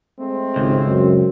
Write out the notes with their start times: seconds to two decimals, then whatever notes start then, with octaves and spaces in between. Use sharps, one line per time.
0.19 G#3 A3 C4
0.56 G#1 C#2
0.87 F#2